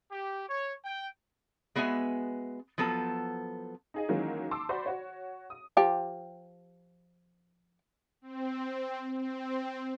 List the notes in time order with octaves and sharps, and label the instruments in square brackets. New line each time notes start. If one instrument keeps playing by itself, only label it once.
[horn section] G4
C#5
G5
[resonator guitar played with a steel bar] G#3 B3 F#4 E5 G#5
F3 F#3 B3 A4
[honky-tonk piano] D#4 G#4 D#5
D#3 E3 F#3 G#3 A#3 C#4
A5 C6 D6 E6
F#4 C5 D5 B5 C6
F#4 C#5
D#6
[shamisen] F3 G4
[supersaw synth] C4
C4